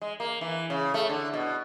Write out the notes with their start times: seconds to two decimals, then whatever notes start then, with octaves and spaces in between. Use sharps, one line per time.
0.01 G#3
0.20 A#3
0.41 E3
0.70 C#3
0.94 A3
1.09 D3
1.34 B2